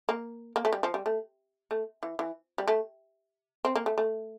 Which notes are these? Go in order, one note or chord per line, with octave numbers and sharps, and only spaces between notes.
A#3
A#3
A3
G3
F3
G3
A3
A3
E3
E3
G3
A3
C4
A#3
A3
A3